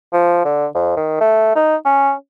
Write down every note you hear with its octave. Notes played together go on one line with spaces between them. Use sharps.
F3
D3
F2
D#3
A3
D#4
C#4